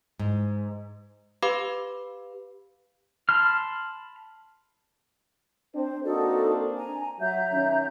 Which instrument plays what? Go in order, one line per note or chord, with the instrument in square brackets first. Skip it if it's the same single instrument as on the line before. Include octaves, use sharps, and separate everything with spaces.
[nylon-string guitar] G#2
[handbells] G4 B4 F5 B5 D6
[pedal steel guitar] A5 B5 C6 F6
[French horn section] C4 D4 [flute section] C5
[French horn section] A#3 C4 D4 [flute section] D#4 F#4 A4
[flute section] G#5 A#5
[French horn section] F#3 [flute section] E5 A#5 G6
[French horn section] F#2 D#3 C#4